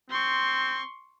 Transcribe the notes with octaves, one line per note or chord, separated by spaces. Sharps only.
C4 C6 C#6